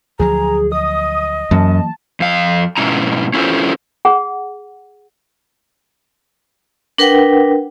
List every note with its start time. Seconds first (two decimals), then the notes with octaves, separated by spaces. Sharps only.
0.19 D2 F3 F#3 G#4 A#5
0.72 D#5 D#6
1.51 F#2 E3 F#3 A#3 A5
2.20 F2 F5
2.77 G#2 B2 C#4 E4 A#5
3.34 C#4 E4 F4 A4 C5
4.05 G#4 F#5
6.98 D4 A#4 B4 F#5 G5